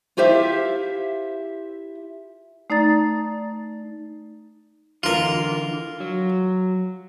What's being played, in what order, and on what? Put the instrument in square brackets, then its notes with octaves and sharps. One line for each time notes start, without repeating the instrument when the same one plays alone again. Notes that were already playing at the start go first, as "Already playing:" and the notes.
[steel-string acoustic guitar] E4 F4 G4 C5 E5
[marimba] A3 D#4 D5 A#5 A6
[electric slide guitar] D3 E3 [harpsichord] F4 A#4
[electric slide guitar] F#3